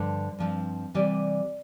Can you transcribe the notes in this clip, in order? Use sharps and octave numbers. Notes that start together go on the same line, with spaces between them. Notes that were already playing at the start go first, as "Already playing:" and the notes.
Already playing: G2 D3 F3 C5
G2 F3 C4
C3 E3 G3 D5